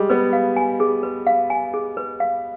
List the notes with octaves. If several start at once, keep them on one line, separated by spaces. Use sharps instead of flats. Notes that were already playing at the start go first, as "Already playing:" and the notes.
Already playing: G3 G#3 G#4
B3 B4
F5
G#5
G#4
B4
F5
G#5
G#4
B4
F5